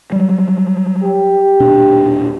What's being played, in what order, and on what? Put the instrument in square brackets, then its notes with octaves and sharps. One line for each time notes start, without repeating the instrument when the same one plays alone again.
[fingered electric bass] F#3 G3
[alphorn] G4
[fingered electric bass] D#1 B2 D4